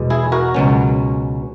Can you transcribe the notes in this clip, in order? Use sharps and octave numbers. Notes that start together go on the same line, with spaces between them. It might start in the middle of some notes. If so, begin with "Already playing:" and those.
Already playing: E2 B2 G#3
E4 G#4
F#4 A#4
C#2 B2 F#3 C#4